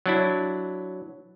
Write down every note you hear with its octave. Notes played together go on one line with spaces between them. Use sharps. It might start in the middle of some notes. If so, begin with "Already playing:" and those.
F#3 D4 E4